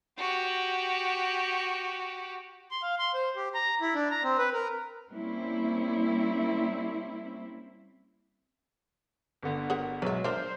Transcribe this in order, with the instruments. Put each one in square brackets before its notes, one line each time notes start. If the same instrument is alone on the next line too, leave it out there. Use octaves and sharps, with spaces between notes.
[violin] F#4 G4
[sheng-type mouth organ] C6
F5
C6
C5
G4
A#5
E4
D4
A#5
C4
B4
A#4
[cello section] G3 A#3 C4 C#4 E4
[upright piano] G1 D3 B3
[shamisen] G#4 A#4 F#5
[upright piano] B1 G#3 [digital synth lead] F#3 [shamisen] B4 E5
[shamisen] D4 E5 [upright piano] A#4 [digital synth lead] C5